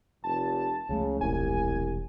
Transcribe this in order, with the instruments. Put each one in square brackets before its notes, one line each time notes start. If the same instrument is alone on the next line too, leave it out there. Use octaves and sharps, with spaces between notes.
[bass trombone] F1 [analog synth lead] A5
[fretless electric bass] C#2 F3 A3 [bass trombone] C#3
[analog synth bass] E1 [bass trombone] C2 [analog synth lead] G#5